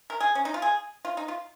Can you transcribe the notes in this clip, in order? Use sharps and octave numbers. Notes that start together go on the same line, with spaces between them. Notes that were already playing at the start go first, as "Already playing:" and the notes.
A#4
G#4
C#4
D#4
F4
G#4
F4
D#4
F4